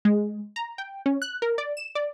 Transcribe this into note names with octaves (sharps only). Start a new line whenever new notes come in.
G#3
A#5
G5
C#4
F#6
A#4
D5
E7
D5